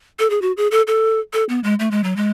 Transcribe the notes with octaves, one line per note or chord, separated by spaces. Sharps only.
A4
G#4
F#4
G#4
A4
A4
A4
B3
G#3
A3
G#3
F#3
G#3